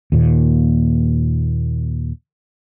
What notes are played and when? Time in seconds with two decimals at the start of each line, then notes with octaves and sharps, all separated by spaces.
0.12 D#2 A#2